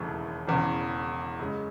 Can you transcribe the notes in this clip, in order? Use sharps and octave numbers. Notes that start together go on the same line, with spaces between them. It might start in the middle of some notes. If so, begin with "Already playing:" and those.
Already playing: E1 D#2 C#3 E3 A3
E1 E2 C#3
F#2 C#3 G#3